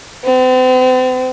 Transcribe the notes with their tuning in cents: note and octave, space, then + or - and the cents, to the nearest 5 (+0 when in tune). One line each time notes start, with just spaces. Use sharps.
C4 -40